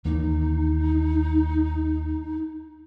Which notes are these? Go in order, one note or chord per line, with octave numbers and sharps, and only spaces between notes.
D#2 E3 A#3 D#4